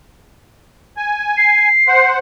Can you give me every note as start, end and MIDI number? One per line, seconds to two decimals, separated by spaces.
0.97 1.69 80
1.37 2.10 96
1.88 2.19 72
1.88 2.19 78